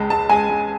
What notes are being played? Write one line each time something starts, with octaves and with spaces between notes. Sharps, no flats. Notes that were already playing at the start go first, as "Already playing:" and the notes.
Already playing: C#2 G#3 A5
G#3 A5
G#3 G#5
G#3